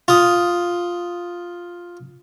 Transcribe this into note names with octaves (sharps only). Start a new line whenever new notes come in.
F4 D#6